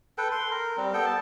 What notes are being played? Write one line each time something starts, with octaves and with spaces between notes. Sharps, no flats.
A4 B4 G5
C6
A#4
G3 C4
B3 A4 G5
A5